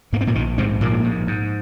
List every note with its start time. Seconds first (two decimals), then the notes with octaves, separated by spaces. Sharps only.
0.13 G#2 A#3
0.21 C4
0.27 A#2 A#3
0.35 A#1 D#3
0.58 G#2 C3 C4
0.81 A#1 A#2 A#3
1.04 G#2
1.27 G#2